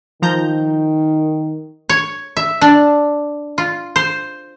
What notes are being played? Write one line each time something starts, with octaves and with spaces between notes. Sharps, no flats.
D#3 F3 A#5 G6
C#5
E5
D4
F4
C5